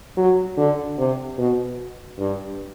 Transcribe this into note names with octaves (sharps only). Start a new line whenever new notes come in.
F#3
D3
C3
B2
G2